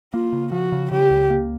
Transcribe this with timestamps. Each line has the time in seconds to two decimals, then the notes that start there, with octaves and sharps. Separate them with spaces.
0.13 A#3 F4
0.33 C#3
0.52 F3 F#4
0.72 C#3
0.91 C#3 G4
1.10 C#2
1.30 A#3